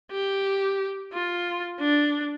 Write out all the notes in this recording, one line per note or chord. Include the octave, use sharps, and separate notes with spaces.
G4
F4
D4